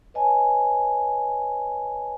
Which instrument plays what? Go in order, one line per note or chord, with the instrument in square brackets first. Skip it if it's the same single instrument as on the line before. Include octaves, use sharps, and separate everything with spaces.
[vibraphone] B4 C#5 D#5 G#5 A5